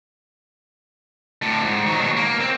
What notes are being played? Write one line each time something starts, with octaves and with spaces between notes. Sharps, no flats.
A2 D3
F2 G#2
D#3 F#3
D#2 B2
A#3
C4